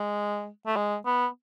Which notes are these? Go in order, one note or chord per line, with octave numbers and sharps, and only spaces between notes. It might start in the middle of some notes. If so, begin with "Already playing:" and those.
Already playing: G#3
A3
G#3
B3